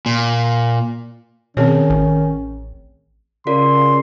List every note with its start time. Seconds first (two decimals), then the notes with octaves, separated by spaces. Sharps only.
0.06 A#2
1.57 B2 D#3 C4 C#4 G#4 C#5
1.90 A1
3.47 C#3 F4 A#4 D5 C6